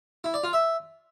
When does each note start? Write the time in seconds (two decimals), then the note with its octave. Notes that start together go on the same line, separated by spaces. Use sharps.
0.24 E4
0.34 D5
0.44 F4
0.53 E5